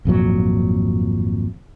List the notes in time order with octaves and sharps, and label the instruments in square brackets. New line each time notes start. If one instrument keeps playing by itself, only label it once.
[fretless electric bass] G#1 F2 A#2 F#3